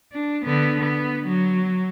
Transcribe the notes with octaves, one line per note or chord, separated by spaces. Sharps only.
D4
D3 B3
B3
F#3